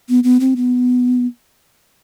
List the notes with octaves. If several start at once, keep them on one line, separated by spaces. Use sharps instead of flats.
B3
B3
C4
B3